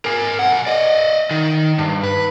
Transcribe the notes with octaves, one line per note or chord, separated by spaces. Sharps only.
A#4 G#5
B1 F#5
D5 D#5
D#3
G2
B4